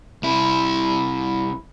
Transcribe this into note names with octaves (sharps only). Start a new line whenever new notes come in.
C2 E4